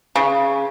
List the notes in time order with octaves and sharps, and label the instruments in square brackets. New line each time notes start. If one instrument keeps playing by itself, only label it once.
[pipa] C#3